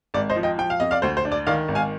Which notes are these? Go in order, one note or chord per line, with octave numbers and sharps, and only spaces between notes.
G#1 D5
C5 D#5
F3
D#5 G5
F3 G5
F5
F2 D#5
D5 F5
D2 C5
C5
D4
D5
D#3 D5 F5
G#1
F5 G#5